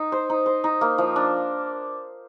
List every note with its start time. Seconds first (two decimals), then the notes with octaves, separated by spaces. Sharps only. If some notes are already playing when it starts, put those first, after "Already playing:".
Already playing: D#4
0.12 C5
0.30 D#4
0.46 C5
0.64 D#4
0.81 A#3
0.98 F3
1.16 D4